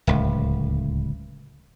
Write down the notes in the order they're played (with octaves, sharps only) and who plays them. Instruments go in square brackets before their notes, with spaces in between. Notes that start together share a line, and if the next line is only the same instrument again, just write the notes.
[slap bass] D1 C#2